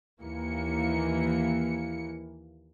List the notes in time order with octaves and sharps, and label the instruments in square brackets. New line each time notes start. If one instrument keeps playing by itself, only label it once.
[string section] D#2 E3 A#3 C#7